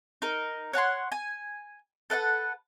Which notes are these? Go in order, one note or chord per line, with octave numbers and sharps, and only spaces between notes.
D#4 A#4
C#5 F#5 A5 C6
G#5
A4 B4 F5 F#5